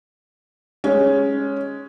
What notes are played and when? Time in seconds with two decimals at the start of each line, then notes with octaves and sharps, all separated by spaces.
0.84 G#3 C#4